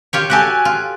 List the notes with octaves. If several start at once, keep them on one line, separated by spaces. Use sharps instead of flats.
F4 G4 C#5
F#4 G4 A4 G#5 F#6
F4